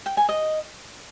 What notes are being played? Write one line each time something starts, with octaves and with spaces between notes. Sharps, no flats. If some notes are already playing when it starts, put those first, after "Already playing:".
G5
G#5
D#5